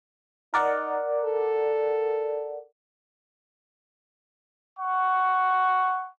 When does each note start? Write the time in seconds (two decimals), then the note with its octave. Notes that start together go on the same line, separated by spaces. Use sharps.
0.54 D#4 A#4 D5 F#5
1.25 A4
4.78 F#5 C#6